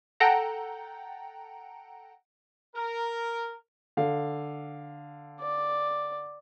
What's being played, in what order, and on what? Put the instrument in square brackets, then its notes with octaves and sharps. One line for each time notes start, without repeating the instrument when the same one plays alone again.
[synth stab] A4 F#5 G5 A#5
[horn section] A#4
[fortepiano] D3 F5
[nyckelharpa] D5